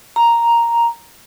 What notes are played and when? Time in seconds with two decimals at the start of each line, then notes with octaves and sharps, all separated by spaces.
0.16 A#5